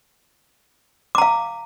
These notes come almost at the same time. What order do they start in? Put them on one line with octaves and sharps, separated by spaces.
D6 A#5 F5